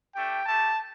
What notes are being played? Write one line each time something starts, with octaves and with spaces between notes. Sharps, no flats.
A3 D4 G4 G5
A3 G4 A5